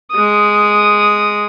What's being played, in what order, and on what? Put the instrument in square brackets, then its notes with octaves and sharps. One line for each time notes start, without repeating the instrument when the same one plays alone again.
[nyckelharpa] G#3 D#6